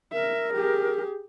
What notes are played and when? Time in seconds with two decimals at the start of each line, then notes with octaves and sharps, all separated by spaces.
0.13 A#4 E5
0.53 G4 G#4